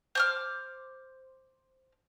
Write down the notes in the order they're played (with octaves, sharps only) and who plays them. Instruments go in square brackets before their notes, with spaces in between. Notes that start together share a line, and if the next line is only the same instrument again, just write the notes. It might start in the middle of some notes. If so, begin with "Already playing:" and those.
[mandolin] C5 D6 F6